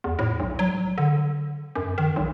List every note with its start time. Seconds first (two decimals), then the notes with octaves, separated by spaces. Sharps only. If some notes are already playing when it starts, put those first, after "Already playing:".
0.04 E2
0.19 A2
0.40 B1
0.59 F#3
0.98 D3
1.76 F#2
1.98 D#3
2.16 B1